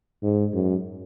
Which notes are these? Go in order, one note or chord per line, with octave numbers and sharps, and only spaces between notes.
G#2
F#2